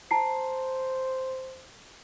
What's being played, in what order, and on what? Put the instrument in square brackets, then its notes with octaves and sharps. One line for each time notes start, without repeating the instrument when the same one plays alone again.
[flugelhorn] C5 [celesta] A5 A#5 C7